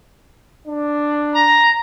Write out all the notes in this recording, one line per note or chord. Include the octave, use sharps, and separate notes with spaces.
D4
A#5